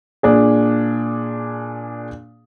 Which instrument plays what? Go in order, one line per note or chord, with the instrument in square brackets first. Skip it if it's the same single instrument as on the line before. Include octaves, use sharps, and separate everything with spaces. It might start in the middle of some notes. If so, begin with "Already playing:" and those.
[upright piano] A#2 D4 G#4